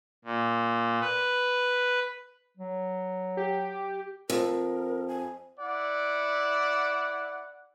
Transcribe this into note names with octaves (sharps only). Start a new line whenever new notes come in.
A#2
B4
F#3
G4
F2 A#4
G#5
E4 D5 F#5